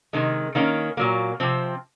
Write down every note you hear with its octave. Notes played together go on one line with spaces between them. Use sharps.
C3 D#3 G#3
D#3 A#3 C#4
A#2 F#3 A#3
C3 F3 C4